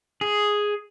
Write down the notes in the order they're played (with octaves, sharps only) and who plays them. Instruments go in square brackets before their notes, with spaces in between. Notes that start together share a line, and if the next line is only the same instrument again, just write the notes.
[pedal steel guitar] G#4